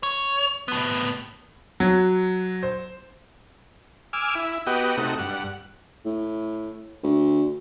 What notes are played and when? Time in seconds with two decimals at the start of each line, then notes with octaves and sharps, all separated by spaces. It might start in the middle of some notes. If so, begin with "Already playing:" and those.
0.03 C#5
0.68 A2 B3
1.80 F#3
2.63 C5
4.13 G#5 D6 E6 F6
4.35 E4
4.67 B3 F#4 G4 D#5
4.97 C3 A3 D#4 F#4
5.19 G2 F#5
6.05 A2
7.03 D2